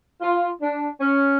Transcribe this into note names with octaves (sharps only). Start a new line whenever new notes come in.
F4
D4
C#4